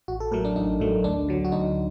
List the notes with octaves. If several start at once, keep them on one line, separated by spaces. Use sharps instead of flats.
A1 F#4
A4
A2 F#3 A3 A#4
D4
A1 D#4
A2 F#3 A3
D2 D4
D3 F#3
F#4
D2 D#4